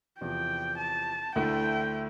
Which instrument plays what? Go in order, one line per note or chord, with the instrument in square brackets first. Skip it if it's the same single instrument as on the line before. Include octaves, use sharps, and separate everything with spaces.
[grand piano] E2 C3 F3 [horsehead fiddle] G5
[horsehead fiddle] A5
[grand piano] D2 D3 A3 E4 [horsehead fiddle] G5